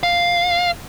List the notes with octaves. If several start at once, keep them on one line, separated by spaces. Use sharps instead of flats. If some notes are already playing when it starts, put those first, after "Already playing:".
F5